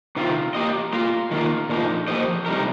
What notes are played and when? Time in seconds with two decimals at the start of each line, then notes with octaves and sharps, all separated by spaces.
0.16 C3 D#3 C4 F4
0.55 A#3 G4 D#5
0.93 A#3 F4 A#4 F5
1.31 D#3 A#3 F4
1.70 A#2 F3 A#3 D#4
2.08 F3 A#3 G4 C5 D#5
2.46 C3 G3 D#4 A#4